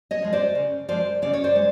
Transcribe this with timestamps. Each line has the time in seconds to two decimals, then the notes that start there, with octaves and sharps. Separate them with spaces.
0.11 C#5 D#5
0.22 F3 G#3
0.33 C5 D5
0.55 C#3
0.88 F3 G#3 C5 D5
1.22 C#3 D5
1.33 C#5
1.44 C5 D5
1.56 G#3